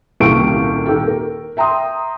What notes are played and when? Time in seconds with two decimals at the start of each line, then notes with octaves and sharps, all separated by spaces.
0.20 D#1 C2 A#3 G4 C#6 D7
0.86 D#3 G4 A4
1.07 A#4
1.57 E5 G5 A#5 C6 D#6